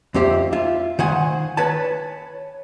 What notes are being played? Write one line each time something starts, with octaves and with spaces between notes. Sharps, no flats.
F2 C4 G4 E5
F4 E5
D#3 C5 F#5 G#5
B4 C#5 A5